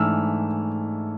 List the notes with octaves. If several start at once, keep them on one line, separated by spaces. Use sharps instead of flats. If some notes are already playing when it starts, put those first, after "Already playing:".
Already playing: G#2 E3 A3 D4 E6 F6